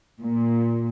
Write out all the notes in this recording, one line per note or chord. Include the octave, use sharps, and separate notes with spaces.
A#2